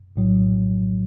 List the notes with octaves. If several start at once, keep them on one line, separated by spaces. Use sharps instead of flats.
A#1 A2 F#3